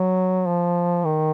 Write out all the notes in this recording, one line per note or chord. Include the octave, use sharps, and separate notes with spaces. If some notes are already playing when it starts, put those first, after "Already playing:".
Already playing: F#3
F3
D#3